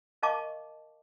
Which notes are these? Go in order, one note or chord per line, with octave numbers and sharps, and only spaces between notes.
A#4 D#5 F5 A5 C#6 D6